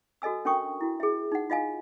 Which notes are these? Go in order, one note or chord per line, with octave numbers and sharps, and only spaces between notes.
F#4 A4 D#5 G#5 E6
C#4 D4 A#4 G5 C#6 D#6
E4 F#4
G#4 E5
D#4 F#5
F4 D#5 F5 G#5